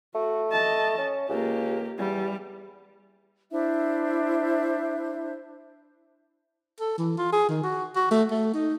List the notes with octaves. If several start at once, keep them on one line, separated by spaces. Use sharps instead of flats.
A3 F#4
D#5 A5
C#4
C#2 A#3 G4
E2 G3
D4 E4 C5 E5
A4
E3
F4
G#4
D#3
F#4
F#4
A3
A3
D#4